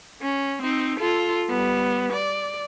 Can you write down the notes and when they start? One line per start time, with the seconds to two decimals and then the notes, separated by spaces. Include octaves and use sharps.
0.22 C#4
0.61 C4 D#4
1.00 F4 A4
1.49 G3 B3
2.13 D5